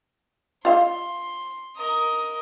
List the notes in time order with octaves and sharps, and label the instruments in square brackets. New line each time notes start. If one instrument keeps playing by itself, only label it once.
[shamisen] F4 F5 [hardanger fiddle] C6
[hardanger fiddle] A#4 D#5